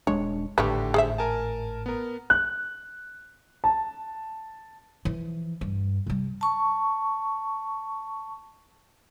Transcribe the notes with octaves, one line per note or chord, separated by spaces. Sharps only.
D#1 G#3 D4 C#5
G#1 A2 D3 G3 A3 G4 B4 C#6
G#4 C5 E5
A#4 G#5 A5
B3 A#4
F#6
A5
E3 F3
G2
C3 G3
A5 C#6